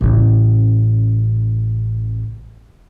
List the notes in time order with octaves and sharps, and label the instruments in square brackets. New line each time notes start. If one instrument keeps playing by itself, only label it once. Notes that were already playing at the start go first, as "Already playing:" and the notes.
[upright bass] A1 C#3